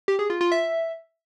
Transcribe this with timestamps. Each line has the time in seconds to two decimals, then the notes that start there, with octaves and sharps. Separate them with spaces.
0.08 G4
0.19 G#4
0.30 F4
0.41 F4
0.52 E5